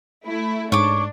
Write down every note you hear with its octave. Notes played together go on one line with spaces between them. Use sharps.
A3 E4
G#2 D4 C#5 D6